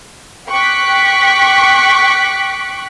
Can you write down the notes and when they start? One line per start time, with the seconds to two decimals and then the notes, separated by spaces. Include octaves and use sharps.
0.49 G5 C#6 D6 F#6 B6